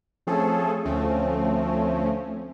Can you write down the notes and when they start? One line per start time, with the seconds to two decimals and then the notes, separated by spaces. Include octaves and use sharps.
0.27 F3 A3 C4 C#4 G#4 A4
0.85 D2 F3 A3 C4 C#4